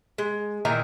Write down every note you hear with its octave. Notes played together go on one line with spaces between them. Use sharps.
G#3
A#2 D#3 E3 A#5